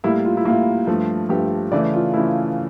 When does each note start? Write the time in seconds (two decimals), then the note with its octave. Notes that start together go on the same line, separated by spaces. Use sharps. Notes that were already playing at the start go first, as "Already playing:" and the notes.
0.04 A2 G3 A#3 E4
0.25 F4
0.37 E4
0.45 A2 G3 A#3 F4
0.87 G2 F3 A3
1.29 G2 F3 A3 G4
1.72 C#3 E3 A3 D5
1.94 F4
2.14 C#3 E3 A3 E4